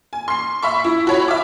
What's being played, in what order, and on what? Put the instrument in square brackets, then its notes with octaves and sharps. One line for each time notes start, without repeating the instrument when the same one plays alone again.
[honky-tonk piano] G#5
C6 C7
E5 B5 C#6
E4
F#4 C#5 B5
E5 D6